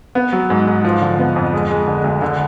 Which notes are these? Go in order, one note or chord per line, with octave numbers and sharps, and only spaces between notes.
B3
F#3
G#2
G#2
F3
D3
B3
F2
G#3
G#3
D3
D2
D3